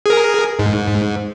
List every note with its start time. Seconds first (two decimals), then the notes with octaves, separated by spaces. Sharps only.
0.06 G#4 A#4
0.59 G#2